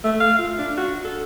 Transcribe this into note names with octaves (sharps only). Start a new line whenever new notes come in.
A3
F5
F4
D4
F#4
A4